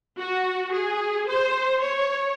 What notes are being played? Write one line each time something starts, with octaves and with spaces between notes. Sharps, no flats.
F#4
G#4
C5
C#5